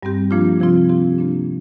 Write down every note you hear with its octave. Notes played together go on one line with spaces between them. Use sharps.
G2 G3 C4 G4
F3 A#3 D4 F4
C3 F3 C4 F4
F3 C4 G4
C3 A#3 D4